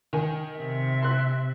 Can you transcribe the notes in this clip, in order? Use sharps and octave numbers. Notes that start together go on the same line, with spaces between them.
D#3 G#5
C3 E5
C6 F#6